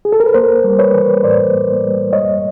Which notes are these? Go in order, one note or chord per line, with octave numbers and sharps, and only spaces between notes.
G#4
A4
A#4
B4
A#3 A#4 C5
G3
B4 C#5
E3
A2 C5 D5
A#3
G3
G#3 C#5 D#5